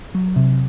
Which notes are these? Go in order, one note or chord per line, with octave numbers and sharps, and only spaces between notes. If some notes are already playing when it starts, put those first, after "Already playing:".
F#3
C3